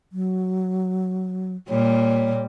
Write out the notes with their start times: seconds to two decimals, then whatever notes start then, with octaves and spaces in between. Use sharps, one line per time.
0.12 F#3
1.69 A#2 G3 C#5